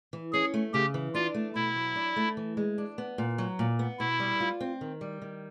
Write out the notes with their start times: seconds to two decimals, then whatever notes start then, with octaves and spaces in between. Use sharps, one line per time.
0.13 E3
0.33 C#4 G#4
0.54 A3
0.74 C#3 G4
0.94 E3
1.14 D4 F4
1.34 A3
1.55 B2 E4
1.76 F#3
1.96 D4
2.16 A3
2.37 E3
2.57 G#3
2.78 D4
2.98 B3
3.18 A#2
3.38 F#3
3.59 A#2
3.79 B3
3.99 B2 E4
4.20 G3
4.40 F4
4.61 C4
4.81 D#3
5.01 G3
5.22 D#3